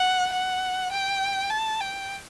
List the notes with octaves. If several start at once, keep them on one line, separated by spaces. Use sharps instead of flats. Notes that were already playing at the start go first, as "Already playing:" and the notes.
Already playing: F#5
F#5
G5
A5
G5